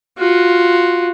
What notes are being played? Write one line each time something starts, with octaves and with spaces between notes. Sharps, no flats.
F4 F#4